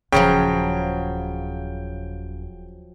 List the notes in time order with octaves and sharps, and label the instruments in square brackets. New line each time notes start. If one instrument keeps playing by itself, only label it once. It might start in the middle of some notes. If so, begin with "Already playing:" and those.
[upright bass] D#1 [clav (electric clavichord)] C#3 [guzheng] F3 F#3 C#5 [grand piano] G5